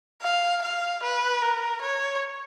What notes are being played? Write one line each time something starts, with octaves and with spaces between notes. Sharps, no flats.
F5
F5
B4
A#4
C#5